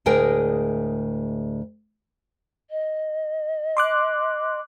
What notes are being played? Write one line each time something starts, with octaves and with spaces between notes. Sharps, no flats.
D2 A2 G#3 G#4 A#4 G5
D#5
C6 D6 F#6